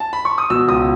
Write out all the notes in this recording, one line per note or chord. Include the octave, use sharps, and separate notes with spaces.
A5
B5
C#6
D#6
B2 E6
C#2 D#6